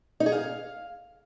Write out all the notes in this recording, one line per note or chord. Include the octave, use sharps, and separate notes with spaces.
D#4
G#4
F5